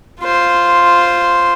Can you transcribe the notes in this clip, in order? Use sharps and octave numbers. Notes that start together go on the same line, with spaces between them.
F4 C5